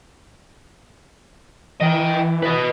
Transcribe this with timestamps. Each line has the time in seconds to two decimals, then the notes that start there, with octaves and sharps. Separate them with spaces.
1.81 E3 D#5 G5
2.43 B4 D#5